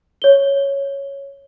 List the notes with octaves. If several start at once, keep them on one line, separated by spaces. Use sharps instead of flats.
C#5 G7